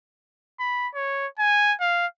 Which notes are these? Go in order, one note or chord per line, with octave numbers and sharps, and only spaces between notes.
B5
C#5
G#5
F5